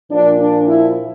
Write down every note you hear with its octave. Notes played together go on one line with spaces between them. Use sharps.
A#2 F3 D4
D4
E4